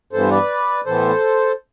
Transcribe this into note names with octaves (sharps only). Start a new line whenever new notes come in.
G2 E3 B3 A4 C5
B4 D5
A2 E3 B3 A4 C5